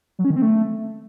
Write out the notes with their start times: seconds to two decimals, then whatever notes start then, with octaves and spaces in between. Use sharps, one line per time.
0.19 F#3
0.25 C#4
0.30 D#3
0.36 C4
0.42 A3